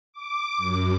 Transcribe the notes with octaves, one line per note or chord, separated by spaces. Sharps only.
D6
F#2